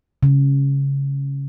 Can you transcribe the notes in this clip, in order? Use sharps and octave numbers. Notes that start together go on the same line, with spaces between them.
C#3